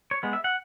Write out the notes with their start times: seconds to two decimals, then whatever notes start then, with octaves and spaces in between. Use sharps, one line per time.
0.11 C#5
0.23 G#3 B3
0.33 E5
0.44 F#5